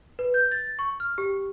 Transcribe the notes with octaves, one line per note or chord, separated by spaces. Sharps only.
B4
G6
A6
C#6
F6
G4